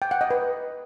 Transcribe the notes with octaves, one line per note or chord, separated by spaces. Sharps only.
G5
F#5
D#5
B4